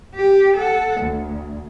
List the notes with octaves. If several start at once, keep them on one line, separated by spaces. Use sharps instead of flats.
G4
A4 F#5
D2